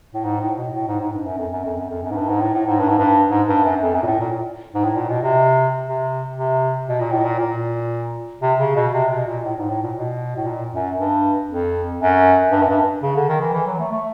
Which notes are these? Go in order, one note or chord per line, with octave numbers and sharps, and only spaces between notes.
A2
G#2
A2
B2
A2
G#2
G#2
G2
F#2
F2
F#2
F2
F#2
F2
F#2
G#2
G2
G#2
A2
A2
G#2
G2
G#2
G2
G#2
G2
F#2
F2
F#2
A#2
A2
A#2
G#2
A2
A#2
B2
C3
C3
C3
B2
A#2
A2
A#2
A#2
C3
C#3
B2
C3
B2
A#2
A2
G#2
A2
A#2
B2
A2
A#2
F#2
G2
F2
F#2
G2
F#2
G2
C#3
D3
D#3
E3
E3
F#3
A3
A3